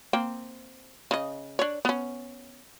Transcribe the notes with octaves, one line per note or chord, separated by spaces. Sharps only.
A#3 C4 G5
C#3 D#5
D4 C#5
B3 C#4